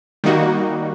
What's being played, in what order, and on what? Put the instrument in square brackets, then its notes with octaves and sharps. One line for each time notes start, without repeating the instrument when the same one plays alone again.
[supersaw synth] D#3 G3 A#3 D#4 F#4